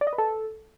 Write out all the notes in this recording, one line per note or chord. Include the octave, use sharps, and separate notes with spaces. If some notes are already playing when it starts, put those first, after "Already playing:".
D5
D#5
B4
A4